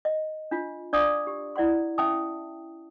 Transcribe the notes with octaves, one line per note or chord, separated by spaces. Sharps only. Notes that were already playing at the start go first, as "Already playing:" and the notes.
D#5
D4 F4
D4 D5 F5 A#5 D6 D#6
G4
E4 D5 F#5 C6
C#4 E5 G5 A5 D#6